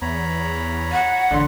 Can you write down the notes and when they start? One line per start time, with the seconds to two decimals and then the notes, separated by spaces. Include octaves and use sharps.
0.02 E2 C#5 A#5 B5
0.92 F#5
1.31 A1 D3 D4 C6